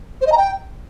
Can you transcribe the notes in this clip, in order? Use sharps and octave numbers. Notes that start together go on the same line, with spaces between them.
C5
D#5
A#5
G5